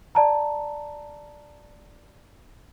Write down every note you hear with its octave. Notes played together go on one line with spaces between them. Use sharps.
D5 A5 A#5